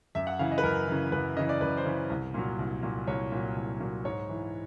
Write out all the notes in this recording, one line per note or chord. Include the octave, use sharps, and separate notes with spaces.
F#2 E5
F#5
C#3 E3 F5
D#5
B4
F#2 A#4
C#3 E3
F#2 B4
C#3 E3 D#5
D5
F#2 B4
C5
C#3 E3
C2
A#2 F#3
C2
A#2 F#3
C2 C#5
A#2 F#3
C2
A#2 F#3
G#2 C#5
E3